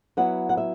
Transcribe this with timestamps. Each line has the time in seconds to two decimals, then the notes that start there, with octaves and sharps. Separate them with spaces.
0.17 F#3 B3 E4 F#5
0.49 F#5
0.57 E5